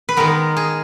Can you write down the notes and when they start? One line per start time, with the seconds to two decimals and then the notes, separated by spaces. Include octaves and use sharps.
0.09 B4
0.17 D#3 G#3 B3 A#4
0.57 G#4